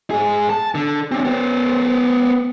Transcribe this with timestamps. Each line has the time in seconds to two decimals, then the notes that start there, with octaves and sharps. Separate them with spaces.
0.11 G#2 G#4
0.50 A5
0.75 D3
1.12 C4 D4
1.25 B3 C5